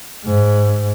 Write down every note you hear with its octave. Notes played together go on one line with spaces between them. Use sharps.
G#2